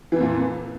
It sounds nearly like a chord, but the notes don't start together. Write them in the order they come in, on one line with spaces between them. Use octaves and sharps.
E3 F2 A#2